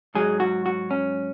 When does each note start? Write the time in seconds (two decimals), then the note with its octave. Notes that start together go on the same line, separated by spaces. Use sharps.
0.15 G#2 F#3 G#4
0.40 F#4
0.66 F#4
0.91 C#4